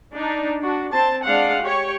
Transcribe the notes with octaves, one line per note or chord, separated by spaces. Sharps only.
D4 D#4
D4 F#4
C4 C5 A5
G#3 D4 F5 F#5
G4 C#5